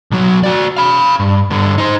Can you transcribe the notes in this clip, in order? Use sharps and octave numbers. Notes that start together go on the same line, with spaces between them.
B1 F#3
F#4 D5
F5 B5
G2
G2 D3
D#4 C5